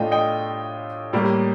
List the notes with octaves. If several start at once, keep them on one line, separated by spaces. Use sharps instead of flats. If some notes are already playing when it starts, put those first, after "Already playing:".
Already playing: A2 A3 D4 F4 D#5 G5
D#5 G5
A2 G3 A#3